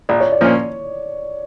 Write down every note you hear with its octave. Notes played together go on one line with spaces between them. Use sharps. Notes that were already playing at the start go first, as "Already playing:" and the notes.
A#1 D5
C#5
D5
A#2 F3 A#3 C#4